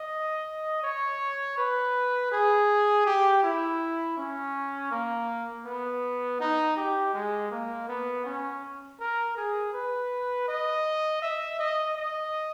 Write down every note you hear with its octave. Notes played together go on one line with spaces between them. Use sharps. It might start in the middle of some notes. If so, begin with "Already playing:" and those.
Already playing: D#5
C#5
B4
G#4
G4
E4
C#4
A#3
B3
D#4
G4
G#3
A#3
B3
C#4
A#4
G#4
B4
D#5
E5
D#5
D#5